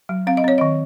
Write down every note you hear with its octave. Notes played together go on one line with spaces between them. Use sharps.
F#3
C4 F5
D#5
C4 C#5
D#3 D#5